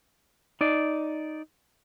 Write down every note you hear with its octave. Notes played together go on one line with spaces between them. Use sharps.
D#4 D5